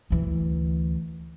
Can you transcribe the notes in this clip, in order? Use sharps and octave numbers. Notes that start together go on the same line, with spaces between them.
D2 E3